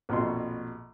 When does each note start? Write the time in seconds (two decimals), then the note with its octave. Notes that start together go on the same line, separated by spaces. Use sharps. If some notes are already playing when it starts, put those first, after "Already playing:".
0.09 A#1 F2 B2 C6